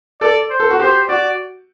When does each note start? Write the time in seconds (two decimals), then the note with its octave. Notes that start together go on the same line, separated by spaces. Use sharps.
0.21 A4 D5
0.50 C5
0.60 A4
0.70 F#4
0.79 G4 C5
1.08 F#4 D5